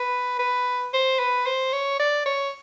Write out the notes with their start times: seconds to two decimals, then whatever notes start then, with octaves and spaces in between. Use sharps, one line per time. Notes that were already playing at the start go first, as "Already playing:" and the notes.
Already playing: B4
0.39 B4
0.93 C5
1.19 B4
1.46 C5
1.73 C#5
2.00 D5
2.26 C#5